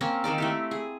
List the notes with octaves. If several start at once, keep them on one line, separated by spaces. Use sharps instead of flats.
A#3 C4 C#4 A#4
D#3 C4 D#4 D5
A3 E4 G4
G#4